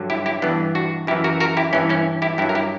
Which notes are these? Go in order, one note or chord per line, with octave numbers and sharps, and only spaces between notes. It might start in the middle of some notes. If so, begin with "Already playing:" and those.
Already playing: G2 D3 F#3
E4 G4
E4 G4
G2 E3 B3 D4
D4 F#4
F#2 E3 E4 G4
F#4 A#4
F#4 A#4
E4 G4
G2 E3 C#4 E4
C#4 E4
E4 G4
G2 F#3 E4 G4
A#4
E4 G4